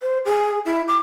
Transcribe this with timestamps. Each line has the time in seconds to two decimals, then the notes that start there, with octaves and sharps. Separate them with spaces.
0.02 C5
0.25 G#4
0.65 E4
0.88 D6